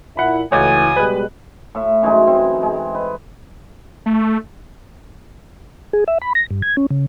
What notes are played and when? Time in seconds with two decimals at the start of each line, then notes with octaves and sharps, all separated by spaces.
0.17 A#2 E4 F#5 B5
0.52 C#2 E3 A3 F#4 C#5 G#5 D#6
0.96 B2 G3 G#3 B4 F#6
1.75 A2 E5
2.02 F#2 E3 G#3 D#4
2.27 C4
2.63 G#3
2.95 B4
4.06 A3
5.93 G#4
6.08 E5
6.22 B5
6.35 A#6
6.51 G2
6.62 G#6
6.77 C#4
6.90 C#3